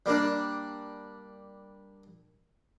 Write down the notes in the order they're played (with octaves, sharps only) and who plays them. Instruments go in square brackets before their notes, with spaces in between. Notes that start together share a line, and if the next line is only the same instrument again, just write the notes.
[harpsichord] G3 A#3 D4